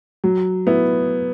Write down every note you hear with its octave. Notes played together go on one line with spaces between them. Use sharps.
F#3
B3 E4